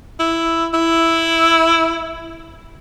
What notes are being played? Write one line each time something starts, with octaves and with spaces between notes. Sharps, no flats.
E4
E4